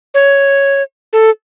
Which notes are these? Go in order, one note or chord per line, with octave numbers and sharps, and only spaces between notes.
C#5
A4